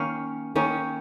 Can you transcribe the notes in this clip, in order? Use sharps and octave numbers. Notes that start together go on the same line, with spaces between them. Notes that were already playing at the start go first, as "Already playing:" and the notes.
Already playing: D#3 A#3 C#4 F5
D#3 A#3 C#4